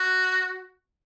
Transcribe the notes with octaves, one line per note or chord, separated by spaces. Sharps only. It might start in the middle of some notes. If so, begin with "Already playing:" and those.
Already playing: F#4